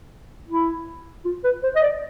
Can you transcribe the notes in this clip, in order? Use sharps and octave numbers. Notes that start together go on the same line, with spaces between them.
E4
F4
B4
C5
D#5
D5